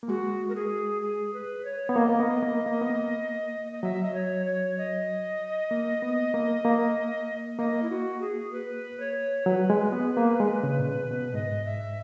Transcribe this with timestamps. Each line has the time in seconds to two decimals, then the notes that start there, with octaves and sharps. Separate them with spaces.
0.03 A#3
0.08 G#3 F#4
0.49 A#4
0.55 G#4
1.02 G#4
1.34 B4
1.65 C#5
1.89 B3
1.96 A#3 D#5
2.09 A#3
2.19 B3
2.43 A#3
2.66 A#3
2.82 B3
2.90 A#3
3.72 D#5
3.83 F#3 E5
4.03 D#5
4.14 C#5
4.46 C#5
4.78 D#5
5.71 A#3
6.02 B3
6.34 A#3
6.65 A#3
7.59 A#3 D#5
7.83 E4
7.90 F#4
8.21 G#4
8.52 B4
9.00 C#5
9.46 F#3 B4
9.70 G#3
9.92 B3
10.17 A#3
10.40 G#3
10.63 C#3
10.78 A#2
10.86 B2
11.03 C#3
11.11 B2
11.34 G#2 D#5
11.65 E5